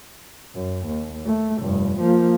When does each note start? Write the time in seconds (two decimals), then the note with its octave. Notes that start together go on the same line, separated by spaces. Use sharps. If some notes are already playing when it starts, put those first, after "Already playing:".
0.54 F#2
0.86 D#2
1.25 A3
1.59 F1 G2
2.00 F3 A#3